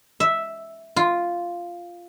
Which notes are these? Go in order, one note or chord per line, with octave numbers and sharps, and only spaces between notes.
E5
F4